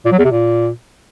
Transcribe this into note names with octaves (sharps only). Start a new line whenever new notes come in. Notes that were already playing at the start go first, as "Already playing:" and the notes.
A#2
F#3
E2
C3
A#2